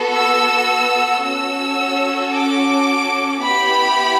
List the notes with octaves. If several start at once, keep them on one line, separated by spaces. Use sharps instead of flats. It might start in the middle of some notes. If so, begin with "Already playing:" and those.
Already playing: B3 F#4 A4
E6
C#4 F#4 A4 E6
D6
B3 E4 G4 B5